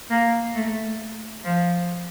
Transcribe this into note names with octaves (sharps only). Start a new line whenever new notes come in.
A#3
A3
F3